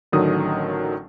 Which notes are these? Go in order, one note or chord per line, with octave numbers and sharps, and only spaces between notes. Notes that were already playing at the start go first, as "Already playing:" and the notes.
A1 D3 D#3 F#3 D#6